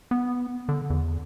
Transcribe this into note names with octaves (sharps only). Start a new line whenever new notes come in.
B3
D3
E2